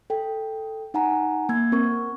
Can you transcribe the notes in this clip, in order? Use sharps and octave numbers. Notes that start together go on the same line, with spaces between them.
A4 G5
D#4 F#5 G#5 A#5
A#3 E6 G#6
C4 A#4 C#6